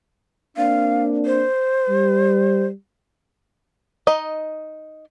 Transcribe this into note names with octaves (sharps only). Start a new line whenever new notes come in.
A#3 C4 D4 F5
C5
G3
D#4 D#5